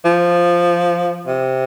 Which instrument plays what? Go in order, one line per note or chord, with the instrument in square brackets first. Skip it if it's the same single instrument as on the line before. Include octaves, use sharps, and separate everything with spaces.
[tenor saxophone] F3
C3